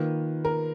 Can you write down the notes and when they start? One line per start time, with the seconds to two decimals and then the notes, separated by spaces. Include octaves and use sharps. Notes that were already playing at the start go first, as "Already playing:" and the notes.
Already playing: D#3 A#3 F4 B4
0.45 A#4